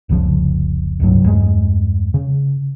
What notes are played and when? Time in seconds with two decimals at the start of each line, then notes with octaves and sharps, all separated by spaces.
0.09 F1 C2 C#3 F3
1.00 D1 C2 G2 F#3
1.25 E2 G2 G#3
2.14 C#3